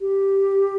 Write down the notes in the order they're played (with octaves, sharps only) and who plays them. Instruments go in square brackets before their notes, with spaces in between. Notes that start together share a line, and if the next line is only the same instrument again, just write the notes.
[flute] G4